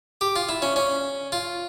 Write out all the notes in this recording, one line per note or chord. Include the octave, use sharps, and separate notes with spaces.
G4
F4
E4
C#4
C#4
F4